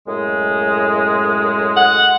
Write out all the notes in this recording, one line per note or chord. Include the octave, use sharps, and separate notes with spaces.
F#2 A2 G#3
F#5